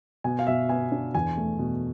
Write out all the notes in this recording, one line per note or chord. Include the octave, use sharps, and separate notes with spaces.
B2 G#5
F5
B2 E5
B3 G#5
D4
E2 G#5
A3
B2